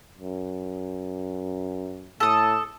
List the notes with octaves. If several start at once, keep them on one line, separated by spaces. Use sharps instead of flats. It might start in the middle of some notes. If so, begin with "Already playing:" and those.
F#2
A2 A4 D#6